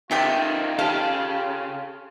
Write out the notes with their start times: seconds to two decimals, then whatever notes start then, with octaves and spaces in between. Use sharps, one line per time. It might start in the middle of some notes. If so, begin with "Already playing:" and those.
0.11 C3 D#3 F4 G4 A4 G5
0.79 C#3 G4 A4 F5